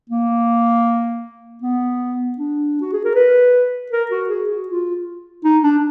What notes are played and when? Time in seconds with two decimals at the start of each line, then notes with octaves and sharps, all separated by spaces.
0.10 A#3
1.62 B3
2.38 D4
2.81 F#4
2.93 G#4
3.05 A#4
3.15 B4
3.92 A#4
4.11 F#4
4.29 G#4
4.49 F#4
4.68 F4
5.45 D#4
5.64 D4